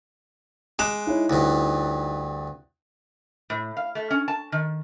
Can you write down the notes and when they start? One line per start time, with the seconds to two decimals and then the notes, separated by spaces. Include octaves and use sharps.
0.79 G#3 D6 D#6 F#6 E7
1.07 D#4 E4 C#5
1.30 D2 G2
3.50 A2
3.77 F5
3.95 A3
4.11 C#4
4.28 A5
4.52 D#3